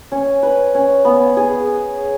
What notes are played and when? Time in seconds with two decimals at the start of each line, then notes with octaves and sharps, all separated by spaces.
0.12 C#4
0.43 B4
0.75 C#4
1.05 B3
1.37 G#4